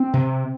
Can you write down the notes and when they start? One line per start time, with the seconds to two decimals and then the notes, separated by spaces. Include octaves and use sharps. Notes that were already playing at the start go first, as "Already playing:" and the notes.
Already playing: C4
0.13 C3